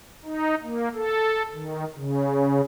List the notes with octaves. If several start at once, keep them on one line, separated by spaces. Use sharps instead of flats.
D#4
A#3
A4
D#3
C#3